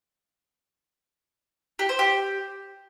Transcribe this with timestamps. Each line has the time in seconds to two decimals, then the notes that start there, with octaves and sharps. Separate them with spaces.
1.79 G4
1.89 C5
1.99 G4